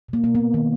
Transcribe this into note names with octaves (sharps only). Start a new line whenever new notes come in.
B2 A#3
B2 A#3
B2 B3
D#3